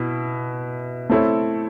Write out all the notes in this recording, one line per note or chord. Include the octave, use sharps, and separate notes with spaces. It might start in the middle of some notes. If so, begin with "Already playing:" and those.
Already playing: B2 E4
A3 C4 E4 A4 C#5